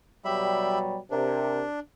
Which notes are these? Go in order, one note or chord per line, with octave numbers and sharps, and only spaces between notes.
B2 F#3 G3 G4 E5 B5
C3 D4 A#4